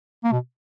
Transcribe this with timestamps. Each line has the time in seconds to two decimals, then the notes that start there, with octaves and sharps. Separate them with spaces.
0.24 A#3
0.32 B2